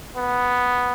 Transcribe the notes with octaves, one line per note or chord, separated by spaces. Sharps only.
B3